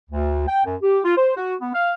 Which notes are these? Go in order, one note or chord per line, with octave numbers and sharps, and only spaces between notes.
D2
G5
F#2
G4
F4
C5
F#4
B3
F5